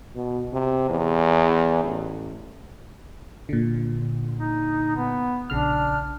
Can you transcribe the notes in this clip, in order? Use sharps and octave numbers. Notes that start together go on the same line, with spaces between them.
B2
C3
E2
A1
A#2 D3
D#4
B3
A#1 C#3 D4 F6